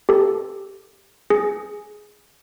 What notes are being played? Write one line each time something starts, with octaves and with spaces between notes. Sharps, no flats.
G4 A4
G#4